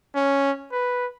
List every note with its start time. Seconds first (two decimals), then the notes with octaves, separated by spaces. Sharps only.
0.16 C#4
0.72 B4